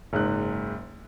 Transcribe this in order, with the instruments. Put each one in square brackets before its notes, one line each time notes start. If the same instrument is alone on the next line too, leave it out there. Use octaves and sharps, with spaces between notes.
[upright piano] F#1 G#2 F#6